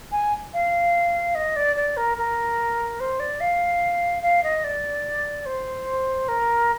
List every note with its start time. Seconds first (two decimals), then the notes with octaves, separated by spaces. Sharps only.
0.11 G#5
0.53 F5
1.34 D#5
1.56 D5
1.76 D5
1.96 A#4
2.17 A#4
3.00 C5
3.19 D5
3.40 F5
4.22 F5
4.43 D#5
4.64 D5
5.45 C5
6.28 A#4